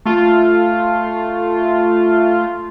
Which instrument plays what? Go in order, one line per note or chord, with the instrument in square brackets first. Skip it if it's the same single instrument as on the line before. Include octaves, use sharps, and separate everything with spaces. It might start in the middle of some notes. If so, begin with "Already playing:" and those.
[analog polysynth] A3 F4